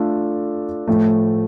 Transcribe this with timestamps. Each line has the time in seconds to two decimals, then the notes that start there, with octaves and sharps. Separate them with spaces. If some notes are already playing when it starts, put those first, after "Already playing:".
Already playing: A3 D4 F4 A4
0.88 A2 F3 A3